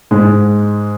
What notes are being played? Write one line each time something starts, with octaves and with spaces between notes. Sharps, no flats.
G#2 G#3